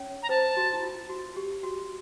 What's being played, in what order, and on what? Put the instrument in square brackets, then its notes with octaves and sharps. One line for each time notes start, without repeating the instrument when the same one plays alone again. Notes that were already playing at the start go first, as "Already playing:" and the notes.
Already playing: [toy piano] C#4 C#5
[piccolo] A#5
[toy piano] C5 [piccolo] A5
[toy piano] F#4
E4
F4
F#4
G4
F#4